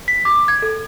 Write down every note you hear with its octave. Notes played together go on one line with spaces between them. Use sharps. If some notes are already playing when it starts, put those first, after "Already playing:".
B6
D6
G#6
A4